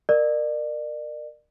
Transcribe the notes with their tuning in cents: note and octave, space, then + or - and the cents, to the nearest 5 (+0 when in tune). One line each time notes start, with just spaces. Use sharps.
A#4 +0 D5 +35